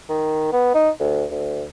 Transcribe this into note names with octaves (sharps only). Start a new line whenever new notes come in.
D#3
B3
D#4
D2
D2